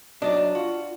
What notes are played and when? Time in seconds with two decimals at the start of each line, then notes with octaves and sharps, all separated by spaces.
0.22 F#3 D4 D#4 D5 D#5
0.55 F4 F#4